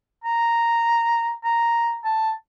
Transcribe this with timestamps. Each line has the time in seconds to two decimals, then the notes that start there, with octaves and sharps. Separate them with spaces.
0.24 A#5
1.44 A#5
2.04 A5